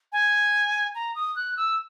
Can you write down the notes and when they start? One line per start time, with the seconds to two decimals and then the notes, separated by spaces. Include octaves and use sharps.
0.12 G#5
0.95 A#5
1.15 D#6
1.36 F#6
1.57 E6